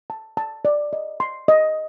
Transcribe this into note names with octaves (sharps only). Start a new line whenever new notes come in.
A5
A5
D5
D#5
C6
D#5